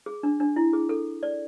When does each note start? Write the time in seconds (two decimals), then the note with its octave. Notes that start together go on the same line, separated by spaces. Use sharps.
0.06 G#4
0.23 D4
0.40 D4
0.56 E4
0.73 G#4
0.89 A4
1.23 D5